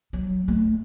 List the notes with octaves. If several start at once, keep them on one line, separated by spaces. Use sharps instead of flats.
F#3
A3